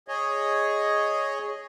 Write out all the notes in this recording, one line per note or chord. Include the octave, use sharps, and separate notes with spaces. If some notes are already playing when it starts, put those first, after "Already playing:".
G#4 C#5 D#5